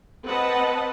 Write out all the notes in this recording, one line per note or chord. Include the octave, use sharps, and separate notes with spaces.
C4 B4 D#5 F#5 A5